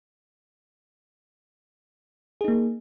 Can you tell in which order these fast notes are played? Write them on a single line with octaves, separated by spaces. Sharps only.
G#4 D#4 A#3